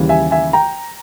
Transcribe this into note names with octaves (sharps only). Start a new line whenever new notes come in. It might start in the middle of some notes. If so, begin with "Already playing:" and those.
Already playing: D#2 C#3 E3 G3
E5 G#5
E5 G#5
G5 A#5